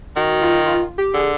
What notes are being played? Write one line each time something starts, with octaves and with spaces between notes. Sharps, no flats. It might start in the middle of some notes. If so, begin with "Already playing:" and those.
D#3 F#4
F4
F4
G4
D3 G#4